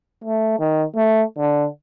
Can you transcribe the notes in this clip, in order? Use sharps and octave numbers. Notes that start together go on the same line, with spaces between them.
A3
D#3
A3
D3